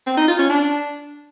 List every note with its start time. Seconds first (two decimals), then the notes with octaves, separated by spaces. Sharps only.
0.07 C4
0.17 D#4
0.28 F4
0.39 C#4
0.50 D4